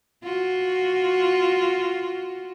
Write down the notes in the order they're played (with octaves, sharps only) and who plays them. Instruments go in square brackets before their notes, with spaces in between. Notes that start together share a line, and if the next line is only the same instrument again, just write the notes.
[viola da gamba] F4 F#4